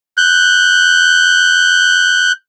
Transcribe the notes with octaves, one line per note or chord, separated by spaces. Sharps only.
F#6 G6